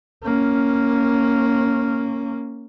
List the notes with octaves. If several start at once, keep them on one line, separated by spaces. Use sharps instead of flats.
A#3 C#4